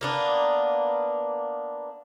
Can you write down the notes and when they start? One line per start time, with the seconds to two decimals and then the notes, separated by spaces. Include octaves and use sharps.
0.01 A#3 B3 D4